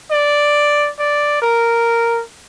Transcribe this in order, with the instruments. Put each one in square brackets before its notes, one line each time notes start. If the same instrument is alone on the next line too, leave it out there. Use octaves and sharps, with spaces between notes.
[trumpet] D5
D5
A#4